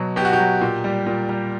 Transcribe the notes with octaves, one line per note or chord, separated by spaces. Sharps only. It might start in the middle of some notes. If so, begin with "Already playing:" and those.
Already playing: B2 F#3
B2 G4
F#4
G4
F#3
A#2
G3
A#2
G3